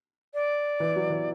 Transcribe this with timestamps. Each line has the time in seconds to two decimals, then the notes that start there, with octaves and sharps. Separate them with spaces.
0.34 D5
0.80 E3
0.96 F#3
1.10 E3